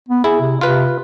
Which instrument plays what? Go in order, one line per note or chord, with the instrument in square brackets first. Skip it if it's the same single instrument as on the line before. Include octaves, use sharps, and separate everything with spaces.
[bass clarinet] B3
[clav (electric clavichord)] E4 [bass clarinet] G#4
[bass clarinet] C3
[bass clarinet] C3 [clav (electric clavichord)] F4 B4